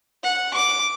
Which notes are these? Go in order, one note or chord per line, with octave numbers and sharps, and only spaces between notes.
F#5
D6